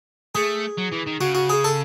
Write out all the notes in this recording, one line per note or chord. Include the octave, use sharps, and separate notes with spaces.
A3 G#4
F#3
E3
D#3
C#3 F#4
F#4
G#4
A4